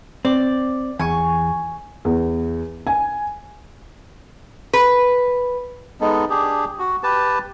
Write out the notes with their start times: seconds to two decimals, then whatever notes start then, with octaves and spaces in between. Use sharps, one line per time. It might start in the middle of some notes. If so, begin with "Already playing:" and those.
0.25 C4 D5
1.00 E2 G#5 C#6
2.05 E2
2.87 G#5
4.73 B4
6.01 G#3 B3 D#4 A4
6.30 D4 G4 G#4
6.79 F#4
7.03 G4 B4 A5